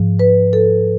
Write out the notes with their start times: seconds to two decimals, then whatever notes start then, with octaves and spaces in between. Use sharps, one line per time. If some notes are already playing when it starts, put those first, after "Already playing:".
Already playing: G#2 F3
0.20 B4
0.53 A4